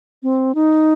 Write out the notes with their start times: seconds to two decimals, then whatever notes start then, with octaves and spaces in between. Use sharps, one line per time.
0.23 C4
0.55 D#4